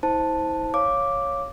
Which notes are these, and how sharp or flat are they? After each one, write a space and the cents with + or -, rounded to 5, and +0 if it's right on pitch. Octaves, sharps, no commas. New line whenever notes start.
E4 -40 C5 +0 A5 +0
C#5 +0 F5 +0 D6 +0